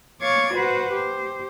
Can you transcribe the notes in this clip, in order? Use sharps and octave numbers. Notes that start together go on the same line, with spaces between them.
C#5 F5 C#6 D6 G#6 A6
F#4 B4 C5 F#5
G4 C5